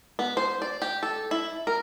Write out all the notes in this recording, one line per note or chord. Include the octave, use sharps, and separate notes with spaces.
B3
C5
D5
G4
A4
E4
A#4